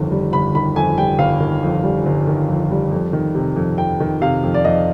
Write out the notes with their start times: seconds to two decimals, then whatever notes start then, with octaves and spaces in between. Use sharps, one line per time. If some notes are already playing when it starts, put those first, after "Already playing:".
Already playing: G1 F2 D#3
0.11 G3
0.32 G1 B5
0.55 D#3 B5
0.76 F2 G#5
0.98 G3 G5
1.19 G1 F5
1.40 D#3
1.63 F2
1.84 G3
2.06 G1
2.27 D#3
2.48 F2
2.71 G3
2.91 F2
3.13 D#3
3.34 C3
3.56 F2
3.78 F2 G5
4.00 D#3
4.21 C3 F5
4.43 F2
4.54 D5
4.65 F2 D#5